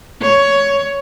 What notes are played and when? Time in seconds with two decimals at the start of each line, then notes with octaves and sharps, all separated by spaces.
0.22 C#5